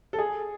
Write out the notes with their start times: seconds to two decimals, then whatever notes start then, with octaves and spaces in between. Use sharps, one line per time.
0.13 A4
0.18 G#4